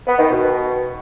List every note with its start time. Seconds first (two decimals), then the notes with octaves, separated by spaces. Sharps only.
0.07 B3
0.19 D#3
0.31 B2